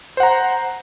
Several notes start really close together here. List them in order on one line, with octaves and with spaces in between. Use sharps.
C5 F#5 A#5